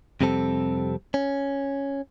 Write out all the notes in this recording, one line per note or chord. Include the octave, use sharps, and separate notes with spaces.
F2 C3 G3 C4 A4
C#4